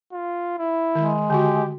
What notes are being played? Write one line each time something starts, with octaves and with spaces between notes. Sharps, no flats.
F4
E4
D#3 G#3
D3 F#4 G4